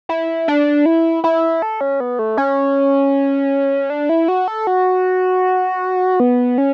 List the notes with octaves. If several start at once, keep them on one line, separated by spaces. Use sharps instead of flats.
E4
D4
E4
E4
A4
C#4
B3
A3
C#4
D4
E4
F#4
A4
F#4
B3
C#4